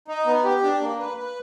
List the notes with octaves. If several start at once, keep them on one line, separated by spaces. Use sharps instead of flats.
D#4
B3
G4
D4
A#3
B4
B4